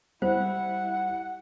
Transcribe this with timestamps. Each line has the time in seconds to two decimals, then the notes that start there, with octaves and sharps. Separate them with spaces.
0.22 G3 E4 C5 F#5